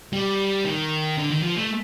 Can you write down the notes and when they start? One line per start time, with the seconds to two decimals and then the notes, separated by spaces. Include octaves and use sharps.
0.13 G3
0.65 D#3
1.18 D3
1.31 D#3
1.43 F3
1.56 A3